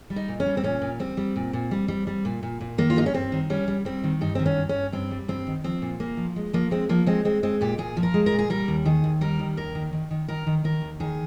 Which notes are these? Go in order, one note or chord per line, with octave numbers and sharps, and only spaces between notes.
G3
D#4
A#2
C#4
G3
C4
A#2 C#4
A#2
G3 C4
G3
A#2
A#2
G3
G3
G3
A#2
A#2
A#2
D#3 A#3
F4
G2 D#4
C#4
G2 C4
D#3
G3 C#4
G3
G3 C4
D#3
G2 D#4
D#3 C4
C#4
G2
G2 C#4
G2 C4
G3
G2 C4
D#3
F3 C4
A#2
A#2 A#3
F3
G#3
F3 A#3
G#3 C4
F3 A#3
G#3 C4
G#3 C4
G#3 C4
A#2 G4
A#2 G#4
F3
A#4
G#3
A#4
A#2
G#4
G3 A#4
D#2
D#3 G#4
D#2
G3 A#4
D#3
D#2 A#4
D#3
D#3
D#3
D#3 A#4
D#3
D#3 A#4
D#2
D#3 G#4